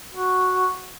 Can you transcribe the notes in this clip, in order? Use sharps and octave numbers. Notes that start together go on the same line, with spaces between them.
F#4